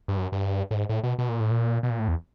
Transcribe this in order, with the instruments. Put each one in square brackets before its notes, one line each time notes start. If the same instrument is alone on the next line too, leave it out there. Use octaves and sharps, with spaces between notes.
[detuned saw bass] G2
F#2
G2
A2
G#2
A2
B2
B2
A#2
A2
A#2
B2
A#2
A2
E2